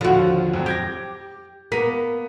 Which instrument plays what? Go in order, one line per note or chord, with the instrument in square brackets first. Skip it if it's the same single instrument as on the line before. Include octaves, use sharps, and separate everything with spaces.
[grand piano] D#2 D3 [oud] F3 F#4
[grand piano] F2 F#3
[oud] G4 [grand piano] G6 G#6 A#6
[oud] A#3 [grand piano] B3 B6 D#7